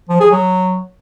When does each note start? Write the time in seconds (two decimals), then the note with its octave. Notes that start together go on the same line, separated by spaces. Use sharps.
0.10 F3
0.21 G#4
0.31 F#3